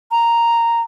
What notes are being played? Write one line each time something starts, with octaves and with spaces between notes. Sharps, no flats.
A#5